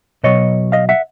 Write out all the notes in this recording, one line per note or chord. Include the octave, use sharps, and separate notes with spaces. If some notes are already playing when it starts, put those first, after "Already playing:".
B2 F#3 C#5 D#5
D#5 F5
E5 F#5